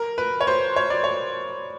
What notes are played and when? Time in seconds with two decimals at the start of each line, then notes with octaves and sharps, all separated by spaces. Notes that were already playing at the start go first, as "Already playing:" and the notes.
Already playing: A#4
0.18 B4
0.41 C#5
0.47 C5
0.76 C#5
0.90 D5
1.04 C#5